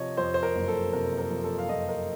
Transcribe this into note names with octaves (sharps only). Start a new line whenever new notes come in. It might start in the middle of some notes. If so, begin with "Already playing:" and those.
Already playing: C3 F3 C#5 D#5
F2 C5
C5
A#4
F#1
A4
C3 A#4
A#4
F3
A4
F5
F2 D#5
A#4